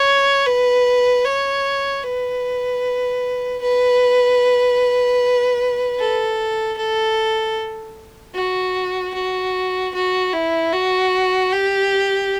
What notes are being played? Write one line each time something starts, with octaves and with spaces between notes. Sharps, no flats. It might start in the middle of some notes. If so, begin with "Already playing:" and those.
Already playing: C#5
B4
C#5
B4
B4
A4
A4
F#4
F#4
F#4
E4
F#4
G4